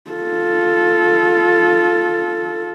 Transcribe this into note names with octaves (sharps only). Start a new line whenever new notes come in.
F4 A4